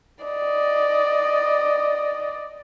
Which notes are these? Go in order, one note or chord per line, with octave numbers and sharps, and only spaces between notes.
D5 D#5